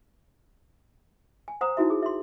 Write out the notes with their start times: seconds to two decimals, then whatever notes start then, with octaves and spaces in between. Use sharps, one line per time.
1.48 G#5
1.61 C5 F#5 A#5 D#6
1.77 D#4 E4 F#4 E5
1.90 G#4
2.03 E5 C6